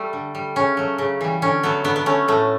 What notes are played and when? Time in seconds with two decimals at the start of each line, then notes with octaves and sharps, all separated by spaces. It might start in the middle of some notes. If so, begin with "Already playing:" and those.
Already playing: G3 A3
0.13 D3
0.35 G3
0.56 C#3 C#4
0.77 F#3 A3
0.98 C#3
1.21 E3 G3
1.42 D3 C#4
1.63 F#3 A3 B3
1.84 D3 B3
1.96 B3
2.06 A3 C#4
2.28 A2 A3